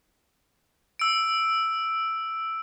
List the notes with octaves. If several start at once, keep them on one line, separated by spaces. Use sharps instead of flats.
E6 D7